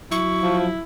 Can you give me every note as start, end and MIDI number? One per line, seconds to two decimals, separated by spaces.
0.12 0.75 54
0.12 0.82 64
0.12 0.57 85
0.42 0.68 53